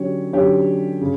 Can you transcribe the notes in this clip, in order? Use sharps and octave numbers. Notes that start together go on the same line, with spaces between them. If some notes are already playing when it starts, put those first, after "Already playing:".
Already playing: D3 F#3 C#4 G4 C#5
D3 F#3 C#4 G4 C#5
C#3